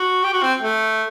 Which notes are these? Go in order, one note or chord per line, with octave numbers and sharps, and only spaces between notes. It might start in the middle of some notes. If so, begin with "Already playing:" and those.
Already playing: F#4
G4
F#4
C4
A3